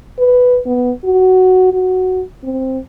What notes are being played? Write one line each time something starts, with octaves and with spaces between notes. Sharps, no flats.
B4
B3
F#4
F#4
C4